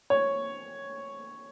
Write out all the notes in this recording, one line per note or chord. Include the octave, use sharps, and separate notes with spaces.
C#5